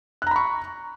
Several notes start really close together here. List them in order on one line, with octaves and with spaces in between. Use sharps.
F#6 A#5 B5 C#6